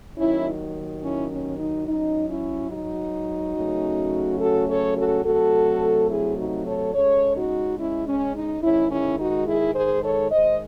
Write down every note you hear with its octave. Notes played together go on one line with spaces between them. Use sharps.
D#2 D#3 F#3 C#4 E4
C#4 E4
C#4
D#4
G#2 F#3 C#4 D#4
C#4 E4
D#4 F#4
C#3 F#3 A3 C#4
F#4 A4
A4 C#5
F#4 A4
C3 F#3 A3 F#4 A4
E4 G#4
D#4 F#4
A4 C#5
C#3 G#3 C#4 A4 C#5
D#4 F#4
C#4 E4
C#4
D#4
G#2 D#3 G#3 C#4 E4
C#4 E4
D#4 F#4
E4 G#4
G#4 C5
A4 C#5
G#2 D#3 G#3 C5 D#5